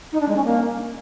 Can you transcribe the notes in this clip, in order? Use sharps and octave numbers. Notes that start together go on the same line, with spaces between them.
D#4
D4
G#3
C#4
A#3